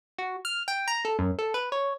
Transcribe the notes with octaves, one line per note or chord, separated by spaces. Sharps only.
F#4
F6
G5
A#5
A4
F#2
A4
B4
C#5